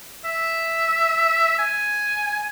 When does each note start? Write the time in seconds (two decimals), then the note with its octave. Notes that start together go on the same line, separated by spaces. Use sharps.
0.25 E5
1.59 G#5